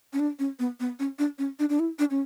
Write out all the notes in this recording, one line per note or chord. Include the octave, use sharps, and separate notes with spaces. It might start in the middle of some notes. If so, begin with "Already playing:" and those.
C#4
D4
C#4
B3
B3
C#4
D4
C#4
D4
D4
E4
D4
C#4